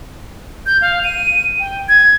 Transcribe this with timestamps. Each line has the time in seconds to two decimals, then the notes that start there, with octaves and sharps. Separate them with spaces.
0.66 G6
0.81 F5
1.04 D#7
1.60 G5
1.89 G#6